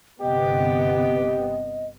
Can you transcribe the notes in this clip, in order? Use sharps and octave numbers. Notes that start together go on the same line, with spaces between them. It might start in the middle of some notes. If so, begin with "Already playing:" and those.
G1 C3 B3 G4 D#5